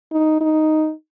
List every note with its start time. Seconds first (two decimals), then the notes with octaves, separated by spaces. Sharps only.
0.12 D#4
0.41 D#4